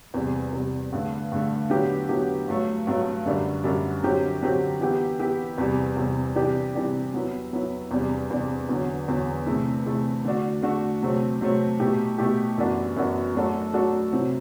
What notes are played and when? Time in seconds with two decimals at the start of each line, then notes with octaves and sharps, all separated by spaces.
0.14 E2 C3 G3
0.53 E2 C3 G3
0.92 G2 D3 A3
1.32 G2 D3 A3
1.70 D3 F#3 B3 E4 G4
2.09 D3 F#3 B3 E4 G4
2.48 G2 F#3 A3
2.87 G2 F#3 A3
3.25 F#2 D3 G3 D4
3.64 F#2 D3 G3 D4
4.03 D3 F#3 C4 G4
4.42 D3 F#3 C4 G4
4.81 E3 B3 E4 G4
5.19 E3 B3 E4 G4
5.58 E2 C3 G3
5.97 E2 C3 G3
6.36 C3 E3 G3 D4 G4
6.75 C3 E3 G3 D4 G4
7.14 F#3 B3 E4
7.53 F#3 B3 E4
7.91 E2 C3 G3 D4
8.31 E2 C3 G3 D4
8.69 E2 D3 F#3
9.08 E2 D3 F#3
9.47 C3 E3 A3 E4
9.86 C3 E3 A3 E4
10.24 D3 A3 D4 F#4
10.63 D3 A3 D4 F#4
11.02 C3 F#3 A3 C4
11.41 C3 F#3 A3 C4
11.80 B2 A3 E4 G4
12.18 B2 A3 E4 G4
12.58 F#2 E3 B3 D4 F#4
12.96 F#2 E3 B3 D4 F#4
13.35 F#3 A3 D4 F#4 A4
13.73 F#3 A3 D4 F#4 A4
14.13 C3 F#3 C4 E4